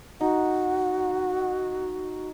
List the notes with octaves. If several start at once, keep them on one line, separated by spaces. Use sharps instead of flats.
D#4 F#4 F#5